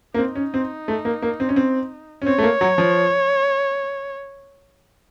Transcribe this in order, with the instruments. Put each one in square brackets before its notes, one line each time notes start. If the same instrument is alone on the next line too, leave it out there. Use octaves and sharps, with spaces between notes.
[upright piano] A#3
[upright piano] C4 [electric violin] D#4
[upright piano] C#4
C4
A3
A#3
A#3
C4
C#4
C4
C#4
[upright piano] C4 [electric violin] C#5
[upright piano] A3
A#3
F#3
F3